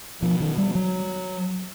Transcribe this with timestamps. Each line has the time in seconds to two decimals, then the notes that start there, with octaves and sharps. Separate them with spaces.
0.22 B2 F3
0.40 D#3
0.57 G3
0.75 F#3